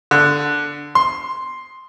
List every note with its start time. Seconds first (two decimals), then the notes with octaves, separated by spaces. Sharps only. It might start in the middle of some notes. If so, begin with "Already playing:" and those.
0.11 D3
0.95 C6